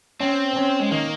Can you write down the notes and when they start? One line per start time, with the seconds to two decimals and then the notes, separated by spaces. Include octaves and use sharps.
0.20 C4 C#4
0.56 C#4
0.80 G#3
0.91 D#3 A#3